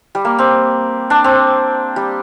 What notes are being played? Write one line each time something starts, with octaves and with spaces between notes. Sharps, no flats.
G3
A#3
C4
D4
C4
G3